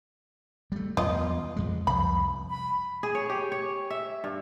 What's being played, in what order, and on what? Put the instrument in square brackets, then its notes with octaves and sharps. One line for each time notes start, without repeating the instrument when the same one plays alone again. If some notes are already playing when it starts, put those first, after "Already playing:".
[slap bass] G3 A3
[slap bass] E2 F3 [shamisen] F4 D#5
[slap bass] F2 G#3
[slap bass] C2 F2 [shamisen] B5
[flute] B5
[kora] G#4
C#5
G4
C#5
E5
G2